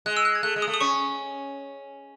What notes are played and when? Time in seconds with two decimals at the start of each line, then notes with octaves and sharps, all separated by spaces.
0.06 G#3 F#6
0.17 E6
0.25 F#6
0.35 G#6
0.43 A3 F#6
0.56 G#3
0.62 D#6
0.67 A3
0.74 D#6
0.81 C#4 C#6